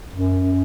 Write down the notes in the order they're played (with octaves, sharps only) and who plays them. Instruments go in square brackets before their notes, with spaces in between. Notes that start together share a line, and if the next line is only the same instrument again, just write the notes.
[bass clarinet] F#2